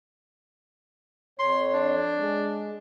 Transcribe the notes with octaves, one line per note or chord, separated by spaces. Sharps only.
F2 C#5 C6
D4
G#3